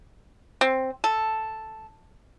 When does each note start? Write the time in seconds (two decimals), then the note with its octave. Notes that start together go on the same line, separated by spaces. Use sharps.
0.61 C4
1.04 A4